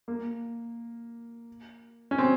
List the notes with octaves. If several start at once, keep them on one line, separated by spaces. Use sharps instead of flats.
A#3
C#4
C4